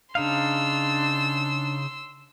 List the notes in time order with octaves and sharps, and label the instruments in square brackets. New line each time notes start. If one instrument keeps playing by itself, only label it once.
[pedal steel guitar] C#3 D#4 F5 [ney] D4 [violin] C6 E6